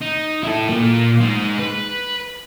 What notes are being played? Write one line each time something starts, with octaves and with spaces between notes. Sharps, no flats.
D#4
E4 A4
A#2 A#3
G#3 D#4
B4